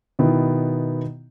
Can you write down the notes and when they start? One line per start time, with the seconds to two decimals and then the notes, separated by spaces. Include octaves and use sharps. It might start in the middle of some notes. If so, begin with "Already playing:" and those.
0.19 B2 D#3 B3 E4